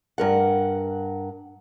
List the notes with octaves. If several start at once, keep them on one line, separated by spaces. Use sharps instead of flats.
G2 A#4 F#5